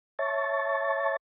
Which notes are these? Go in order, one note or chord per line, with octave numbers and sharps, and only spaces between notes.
C#5 E5 A5 C#6 A6